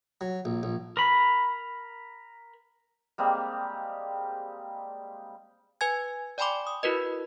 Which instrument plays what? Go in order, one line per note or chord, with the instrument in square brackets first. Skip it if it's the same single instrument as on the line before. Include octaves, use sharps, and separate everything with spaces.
[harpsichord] F#3
A#1
A#1
[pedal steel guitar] A#4 B5
[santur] G3 G#3 A#3 C4
[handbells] B4 G#5 G#6
D5 G5 G#5 B5 C6 D6
D#6
E4 F#4 A#4 B4 D#5